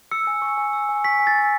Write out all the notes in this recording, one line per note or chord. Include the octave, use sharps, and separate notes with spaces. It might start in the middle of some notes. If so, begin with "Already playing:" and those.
E6 C#7
G#5
C#6
G#5
E6
G#5
C#6 B6
G#5
A6
E6